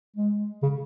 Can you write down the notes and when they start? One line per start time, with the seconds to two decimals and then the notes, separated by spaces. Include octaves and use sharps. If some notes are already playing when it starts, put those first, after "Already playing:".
0.16 G#3
0.63 C#3